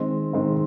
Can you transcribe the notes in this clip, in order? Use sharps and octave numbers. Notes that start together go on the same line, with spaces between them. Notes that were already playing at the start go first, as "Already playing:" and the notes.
Already playing: D#3 G#3 C4
D#3 G#3 C4